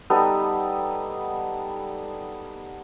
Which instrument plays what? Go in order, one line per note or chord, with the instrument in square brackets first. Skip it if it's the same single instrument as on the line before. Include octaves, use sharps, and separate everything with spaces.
[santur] G3 B3 D#4 A4